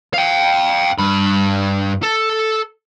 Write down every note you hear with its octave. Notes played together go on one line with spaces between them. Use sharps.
F5 G5
G2 B5
A4